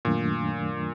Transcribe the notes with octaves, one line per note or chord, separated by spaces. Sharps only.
F#2 A#2 D#3 F#3 A3 D4